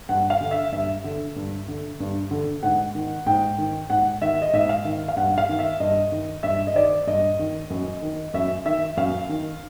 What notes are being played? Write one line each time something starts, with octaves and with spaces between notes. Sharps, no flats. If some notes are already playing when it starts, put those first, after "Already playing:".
G2 F#5
F5
D3
E5
G2 E5
D3
G2
D3
G2
D3
G#2 F#5
D#3
G#2 G5
D#3
G#2 F#5
D#3 E5
D#5
G#2 E5
F5
D#3
F5
G2 F#5
F5
D#3
E5
G2 D#5
D#3
G2 E5
D#5
D#3 D5
G2 D#5
D#3
F#2
D#3
F#2 E5
D#3 E5
F#2 F5
D#3